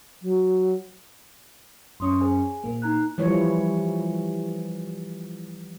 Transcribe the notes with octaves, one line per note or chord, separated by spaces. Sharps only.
F#3
F#2 C#4 C6 C#6 D#6
G#4 C5 G#5
A#2 A#3
D#4 A#5 F#6
E3 F3 G3 C#5